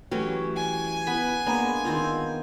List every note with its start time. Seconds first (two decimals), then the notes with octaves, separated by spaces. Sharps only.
0.11 E3 F#3 A3 C#4 G4 G5
0.56 G#5
1.07 B3 B4 B5
1.46 G#3 A#3 B3 D4 A#5 B5
1.85 D#3 C4 F4